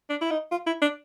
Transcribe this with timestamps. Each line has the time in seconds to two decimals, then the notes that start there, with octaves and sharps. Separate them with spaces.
0.10 D4
0.21 E4
0.31 D#4
0.52 F4
0.67 E4
0.82 D4